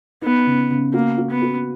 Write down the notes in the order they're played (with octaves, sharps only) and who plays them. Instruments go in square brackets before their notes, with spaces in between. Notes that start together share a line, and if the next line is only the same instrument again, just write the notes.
[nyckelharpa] B3 [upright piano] D#4
[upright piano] C#3
C#3
[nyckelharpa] A#3 [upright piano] F#4
[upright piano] F#4
[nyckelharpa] B3
[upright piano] F#4